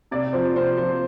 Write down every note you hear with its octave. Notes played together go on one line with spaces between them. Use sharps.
C3 D5
F3 C5
C3 C5
F3 C5